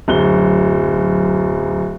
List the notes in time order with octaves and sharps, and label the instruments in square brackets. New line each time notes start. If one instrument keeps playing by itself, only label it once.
[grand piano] D1 F#2 G7